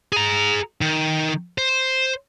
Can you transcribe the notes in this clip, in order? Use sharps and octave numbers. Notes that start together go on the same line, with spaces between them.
G#4 A#5
D#3
C5